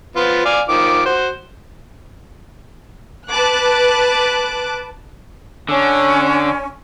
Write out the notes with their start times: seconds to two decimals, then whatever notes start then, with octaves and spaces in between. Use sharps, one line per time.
0.16 F3 B3 F4
0.45 D5 F5 G#5
0.69 D#3 F3 D6
1.05 F#4 C5
3.28 B4 A5 D6 F#6
5.69 D3 C#4